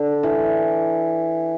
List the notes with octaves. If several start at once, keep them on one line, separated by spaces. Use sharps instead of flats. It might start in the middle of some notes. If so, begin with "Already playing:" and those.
Already playing: D3
E3